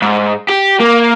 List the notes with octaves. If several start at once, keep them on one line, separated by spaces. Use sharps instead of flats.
G#2
G4
A#3